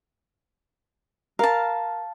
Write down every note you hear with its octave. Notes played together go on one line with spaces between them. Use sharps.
A#4 F5 A5